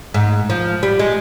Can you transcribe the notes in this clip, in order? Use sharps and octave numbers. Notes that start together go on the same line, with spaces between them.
G#2
F3
G3
G#3